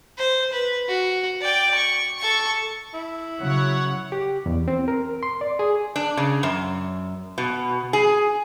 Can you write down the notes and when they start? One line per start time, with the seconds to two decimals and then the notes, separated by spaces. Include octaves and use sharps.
0.18 C5
0.52 B4
0.88 F#4
1.40 D5 G5
1.75 C#6
2.19 A4 C#6
2.94 E4
3.39 C#3 F#3 C#5 F#5
4.12 G4
4.46 E2
4.68 C4
4.88 A#4
5.23 C6
5.41 D5
5.59 G#4
5.96 D4
6.17 C#3
6.43 F#2
7.38 B2
7.93 G#4